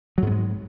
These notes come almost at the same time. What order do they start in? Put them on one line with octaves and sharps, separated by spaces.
F#3 G#2 B3 G#3